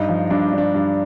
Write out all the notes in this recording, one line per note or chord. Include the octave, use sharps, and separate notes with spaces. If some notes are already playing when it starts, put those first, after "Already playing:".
Already playing: G2 D#4
F3
G2 D4
G2 D4
G2